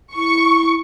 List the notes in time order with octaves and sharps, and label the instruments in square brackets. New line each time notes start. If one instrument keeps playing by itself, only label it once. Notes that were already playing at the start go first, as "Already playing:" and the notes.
[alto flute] E4 [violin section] C#6